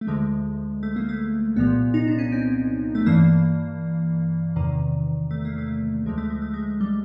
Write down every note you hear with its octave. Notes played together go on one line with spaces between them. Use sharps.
A3
D2 D3 F3 G#3
A3
A#3
A3
C2 A#2 F3 B3
D#4
D4
C#4
C4
A3
G2 E3 A#3
E2 C3 D#3
A3
A#3
A3
D2 D3 F3 G#3
A3
G#3
A3
G#3
G3